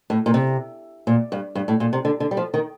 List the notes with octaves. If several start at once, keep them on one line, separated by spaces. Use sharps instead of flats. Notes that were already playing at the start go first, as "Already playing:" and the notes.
A2
A#2
C3
A#2
G2
G2
A2
A#2
C3
D3
D3
G3
F3
D#3